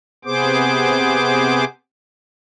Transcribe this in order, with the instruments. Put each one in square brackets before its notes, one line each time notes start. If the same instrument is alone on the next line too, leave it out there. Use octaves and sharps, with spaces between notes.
[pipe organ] C3 B3 G#4 C5 D6